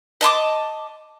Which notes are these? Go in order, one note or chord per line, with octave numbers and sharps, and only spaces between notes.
D#5 A5 C6 D6